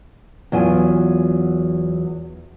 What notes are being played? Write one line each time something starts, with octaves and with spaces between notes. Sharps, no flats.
E2 F#3 F4 G#5